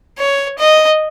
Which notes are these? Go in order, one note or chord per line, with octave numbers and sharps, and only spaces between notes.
C#5
D#5